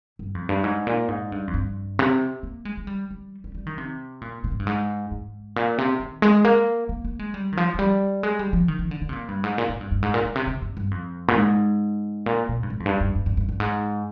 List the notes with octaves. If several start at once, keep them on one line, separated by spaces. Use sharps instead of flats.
G2
F2
G2
G#2
A#2
G#2
G2
F2
G2
C3
A#3
G#3
G#3
G3
G3
G3
G3
D#3
C3
A#2
A#2
G#2
G2
G#2
G#2
A#2
C3
D#3
G#3
A#3
A#3
A#3
G#3
G3
D#3
F3
F3
G3
G#3
G3
F3
D#3
D#3
D3
D3
C3
A#2
G2
G#2
A#2
G#2
G2
G2
G#2
A#2
A#2
C3
C3
G2
G2
F2
A#2
G#2
A#2
A#2
G2
G#2
F2
G2
G2
G2
G2
G2
G2
G#2